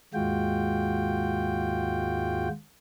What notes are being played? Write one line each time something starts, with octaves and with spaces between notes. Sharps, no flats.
D#2 G#2 G#3 F4 F#4 G5